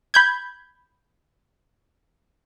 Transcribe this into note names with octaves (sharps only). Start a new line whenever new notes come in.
B5 G6 G#6